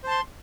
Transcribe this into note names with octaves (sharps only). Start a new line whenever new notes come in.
C5 A5 C6